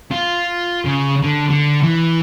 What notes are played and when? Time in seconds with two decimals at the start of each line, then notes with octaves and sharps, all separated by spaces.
0.11 F4
0.85 C#3
1.23 D3
1.50 D3
1.83 E3